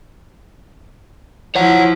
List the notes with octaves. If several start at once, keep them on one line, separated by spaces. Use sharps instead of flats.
F3 E4 C#5 F#5